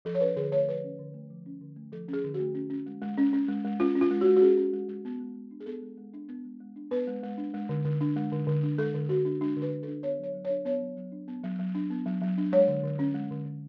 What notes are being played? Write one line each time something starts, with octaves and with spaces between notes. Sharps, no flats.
F3 A4
C#5
C#4 B4
D3 G#4
A3 C#5
F3 B4
C#4
D3
A3
F3
C#4
D3
A3
F3 A4
C#4
G#4
D3
F#4
A3
C#4
C#4
G#3
G#3
C#4
C#4
G#3
G#3
C#4 F4
C#4
F4
G#3
G#3 F#4
F#4
C#4 G#4
C#4
G#3
G#3
B3
G#3
G#3
D4
G#4
B3 A4
G#3
G#3
D4
B3
G#3
G#3
D4
B3 B4
G#3
G#3
D4
G#3
D3
D3
D4
G#3
D3
D3
D4
G#3 A4
D3
D3 F#4
D4
G#3 D4
D3
B4
D3
D4 A4
B3 C#5
F#3 C#5
F#3
C#5
D4
B3 C#5
F#3
F#3
D4
B3
F#3
F#3
D4
B3
F#3
F#3
D4
G#3 C#5
D3
D3
C#4
G#3
D3
D3